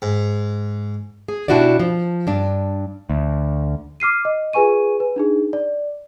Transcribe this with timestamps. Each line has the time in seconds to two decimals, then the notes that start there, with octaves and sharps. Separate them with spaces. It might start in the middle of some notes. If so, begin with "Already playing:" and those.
0.02 G#2
1.28 G#4
1.48 B2 D4 E4 F#4 G4 D5
1.79 F3
2.27 G2 D4
3.10 D2
4.00 D6 F6 C7 D#7
4.25 D#5
4.53 F4 G#4 B4 G#5 C#6 D#7
5.00 B4
5.16 D4 D#4 G#4
5.53 D5